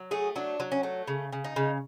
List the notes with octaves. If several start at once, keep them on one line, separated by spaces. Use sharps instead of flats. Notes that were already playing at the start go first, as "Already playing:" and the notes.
Already playing: F#3
A3 G#4
F#3 D4
F#3
C#4
A3
C#3
C#3
D#4
C#3